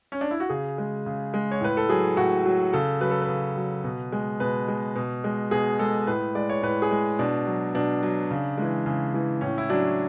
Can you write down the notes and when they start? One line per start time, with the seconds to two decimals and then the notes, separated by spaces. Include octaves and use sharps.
0.12 C#4
0.21 D4
0.31 E4
0.40 F#4
0.49 C#3 G#4
0.78 G#3
1.06 C#3
1.34 G#3
1.51 C#5
1.61 A2 B4
1.77 A4
1.89 F#3 G#4
2.17 A2 F#4
2.45 F#3
2.73 C#3 A4
3.01 F#3 B4
3.11 A4
3.21 B4
3.29 C#3
3.57 F#3
3.84 B2
4.12 G#3
4.40 B2 B4
4.68 G#3
4.96 B2
5.24 G#3
5.51 B2 G#4
5.79 G#3 A4
6.07 A2 B4
6.35 G#3 D5
6.49 C#5
6.62 A2 B4
6.82 G#4
6.91 G#3
7.19 B2 D4
7.47 F#3
7.75 B2 D4
8.03 F#3
8.31 C#3
8.58 E3 G#3
8.86 C#3
9.14 E3 G#3
9.41 A2 C#4
9.58 E4
9.69 F#3 D4